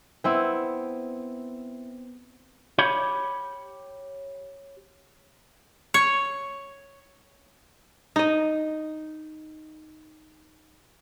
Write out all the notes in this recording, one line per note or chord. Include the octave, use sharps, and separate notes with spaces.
B3 C4 E4
G4 C#5 B5
C#5
D#4 D#5